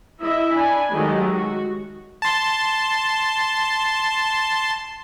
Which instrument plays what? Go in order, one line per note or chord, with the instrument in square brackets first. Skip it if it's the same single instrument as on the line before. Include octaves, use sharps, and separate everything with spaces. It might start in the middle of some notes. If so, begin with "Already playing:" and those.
[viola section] E4 D#5 E5
D4 G#5 B5
D#3 F#3 G#3 A3 G4 D#5
F#4
[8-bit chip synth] A5 C6